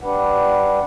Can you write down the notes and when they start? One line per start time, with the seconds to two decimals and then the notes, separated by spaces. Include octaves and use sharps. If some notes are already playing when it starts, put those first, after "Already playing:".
0.01 G3 D4 B4 F#5